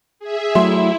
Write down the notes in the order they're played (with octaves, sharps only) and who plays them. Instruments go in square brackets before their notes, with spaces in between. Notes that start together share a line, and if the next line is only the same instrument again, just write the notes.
[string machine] G#4 E5
[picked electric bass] F#3 A3 [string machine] E4 [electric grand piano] E5 C6